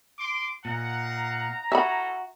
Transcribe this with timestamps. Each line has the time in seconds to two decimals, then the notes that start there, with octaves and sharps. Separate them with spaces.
0.19 C6 D6
0.65 A#2 D#4 F5 F#5 A#5
1.72 C#4 E4 F#4 A4 E5 A5 B5